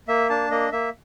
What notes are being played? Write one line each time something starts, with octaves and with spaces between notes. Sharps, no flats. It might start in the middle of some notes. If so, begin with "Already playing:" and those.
A#3 E5
D4 A5
A#3 D#5
A#3 E5